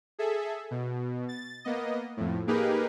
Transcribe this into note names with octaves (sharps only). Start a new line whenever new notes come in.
G#4 A4 E5
B2
A6
A#3 B3 D#5
F2 A2
A#3 D#4 G4 G#4 A#4 B4